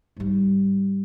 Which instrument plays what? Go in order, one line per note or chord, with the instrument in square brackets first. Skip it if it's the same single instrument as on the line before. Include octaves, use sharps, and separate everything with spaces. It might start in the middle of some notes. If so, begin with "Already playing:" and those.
[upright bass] G#2 G3